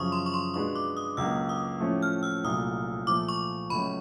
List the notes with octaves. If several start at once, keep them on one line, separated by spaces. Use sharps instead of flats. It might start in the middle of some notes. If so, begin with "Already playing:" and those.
Already playing: F#2 C#3 F3 C#6 D#6
C6
C#6
C6
B2 G#3 B3 D4 F4 C#6
D6
D#6
C#2 B2 F#3 A#3 E6
D#6
A2 F3 A3 C#4
F6
E6
C2 A#2 F#3 A3 D#6
A#2 F3 A3 D6
C#6
C#2 B2 F#3 A3 C#4 B5